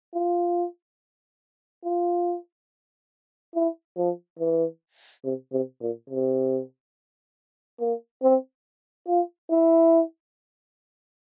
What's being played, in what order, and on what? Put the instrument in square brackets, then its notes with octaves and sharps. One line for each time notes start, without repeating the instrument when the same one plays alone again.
[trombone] F4
F4
E4
F3
E3
C3
C3
A#2
C3
A#3
C4
F4
E4